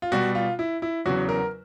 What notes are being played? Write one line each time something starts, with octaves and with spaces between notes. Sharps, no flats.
F4
B2 G3 F#4
F4
E4
E4
E2 C#3 F#3 F#4
A#4